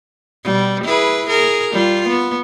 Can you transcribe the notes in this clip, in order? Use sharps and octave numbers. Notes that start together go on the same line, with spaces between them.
B2 G3
E4 G#4 B4
G#4 A#4
G3 F4
B3